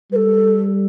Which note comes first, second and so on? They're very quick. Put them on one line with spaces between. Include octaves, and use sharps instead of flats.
G3 B4 A4